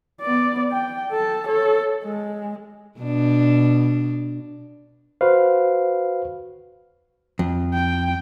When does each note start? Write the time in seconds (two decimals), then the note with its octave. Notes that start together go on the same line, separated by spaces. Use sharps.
0.22 B3 D5
0.72 G5
1.11 A4 A5
1.48 A4 C#5
2.03 G#3
2.99 B2 D4
5.21 F#4 B4 C5 F5
7.39 F2
7.74 G5